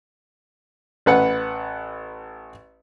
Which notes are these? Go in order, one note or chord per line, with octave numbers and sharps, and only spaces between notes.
A1 B4 F#5